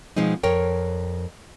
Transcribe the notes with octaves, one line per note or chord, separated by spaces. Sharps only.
B2 F3 G#3 C4 D#4
F2 A#4 C#5 G5